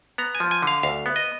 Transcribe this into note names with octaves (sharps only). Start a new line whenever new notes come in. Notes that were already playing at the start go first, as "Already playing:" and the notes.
B3 A#5
G#5
F3
G#5
D3 F5
D2 F5
B3
D#5